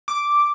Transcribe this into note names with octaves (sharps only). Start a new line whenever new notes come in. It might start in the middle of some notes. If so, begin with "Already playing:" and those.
D6